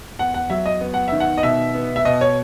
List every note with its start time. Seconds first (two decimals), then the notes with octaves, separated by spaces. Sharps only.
0.19 E2 F#5
0.34 F#5
0.50 F#3 E5
0.66 D#5
0.81 B3
0.94 F#5
1.08 D#3 E5
1.20 F#5
1.38 D#5
1.43 B2 E5
1.75 B3
1.96 E5
2.05 B2 D#5
2.21 C#5